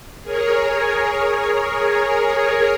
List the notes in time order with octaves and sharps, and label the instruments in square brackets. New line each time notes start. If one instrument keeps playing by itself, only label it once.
[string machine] G#4 A#4 C#5